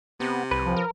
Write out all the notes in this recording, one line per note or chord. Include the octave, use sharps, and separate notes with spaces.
C3 B3
C2 B4
F3
A#4